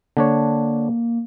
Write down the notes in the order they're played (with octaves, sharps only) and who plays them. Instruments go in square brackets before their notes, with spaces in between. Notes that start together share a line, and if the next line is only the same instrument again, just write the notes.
[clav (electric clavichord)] D3 D4 C#5 [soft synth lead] A#3